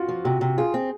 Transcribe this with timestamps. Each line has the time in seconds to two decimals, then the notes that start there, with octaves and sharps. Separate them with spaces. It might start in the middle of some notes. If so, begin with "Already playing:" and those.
Already playing: F4 F#4
0.08 F3
0.25 C3 F#4
0.41 C3
0.58 F4 G#4
0.74 C4